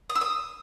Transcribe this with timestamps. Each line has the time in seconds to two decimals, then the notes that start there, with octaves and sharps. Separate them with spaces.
0.10 D#6
0.15 E6
0.21 D#6